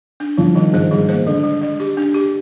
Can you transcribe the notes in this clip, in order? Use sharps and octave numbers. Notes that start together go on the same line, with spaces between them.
D4
F3 G3
D#3 G3
G#2 C5
G#2 G3
A#2 C5
D3 G#3
G#3
G#3
G4
D4
G4